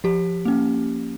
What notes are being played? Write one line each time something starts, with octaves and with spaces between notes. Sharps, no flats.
F3 G4
A#3 C#4